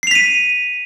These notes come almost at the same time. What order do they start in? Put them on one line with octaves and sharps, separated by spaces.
C7 F7 B6 D#7